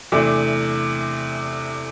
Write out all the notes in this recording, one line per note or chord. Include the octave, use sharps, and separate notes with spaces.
E2 C3 E3 A3 D4